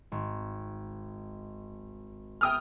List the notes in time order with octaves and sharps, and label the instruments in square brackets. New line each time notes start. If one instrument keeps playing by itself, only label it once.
[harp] G#1
[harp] B3 G#4 E5 [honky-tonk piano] G5 D#6 F6